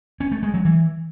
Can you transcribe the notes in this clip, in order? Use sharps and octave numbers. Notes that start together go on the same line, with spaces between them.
C#4
A3
G#3
F#3
E3